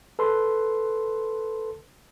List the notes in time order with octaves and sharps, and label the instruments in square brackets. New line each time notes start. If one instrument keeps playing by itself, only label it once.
[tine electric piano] A4 B4 C6